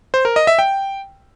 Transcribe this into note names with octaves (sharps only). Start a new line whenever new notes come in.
C5
A#4
D#5
E5
G5